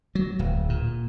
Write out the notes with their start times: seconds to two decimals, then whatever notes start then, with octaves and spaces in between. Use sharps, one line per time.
0.15 F#3
0.39 D1
0.69 A#2